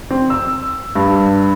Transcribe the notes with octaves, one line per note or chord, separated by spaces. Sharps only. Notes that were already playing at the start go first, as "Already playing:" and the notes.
C4
E6
G2